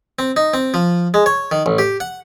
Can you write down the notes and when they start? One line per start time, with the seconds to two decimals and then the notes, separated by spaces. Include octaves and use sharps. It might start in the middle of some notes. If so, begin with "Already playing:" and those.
0.19 C4
0.36 D#4
0.54 C4
0.74 F3
1.14 G#3
1.26 C#5
1.52 D#3
1.66 A1
1.79 G4
2.00 F#5